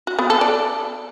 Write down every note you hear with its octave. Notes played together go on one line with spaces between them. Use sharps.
F#4
B3
A4
D5